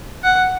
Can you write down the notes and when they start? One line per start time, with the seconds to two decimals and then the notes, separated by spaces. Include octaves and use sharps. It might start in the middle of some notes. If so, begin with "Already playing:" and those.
0.24 F#5